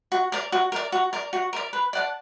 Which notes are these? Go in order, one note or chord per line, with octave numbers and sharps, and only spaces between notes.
F#4
A#4 D5
F#4
A#4 D5
F#4
A#4 D5
F#4
A#4 D5
B4
D5 F#5 A5